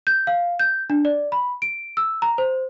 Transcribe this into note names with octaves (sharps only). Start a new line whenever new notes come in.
G6
F5
G6
D4
D5
B5
D7
E6
A#5
C5